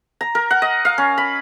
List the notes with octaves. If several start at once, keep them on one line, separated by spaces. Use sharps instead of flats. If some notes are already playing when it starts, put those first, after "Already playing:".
A#5
A#4
F#5
D#5
F5
C#4
B5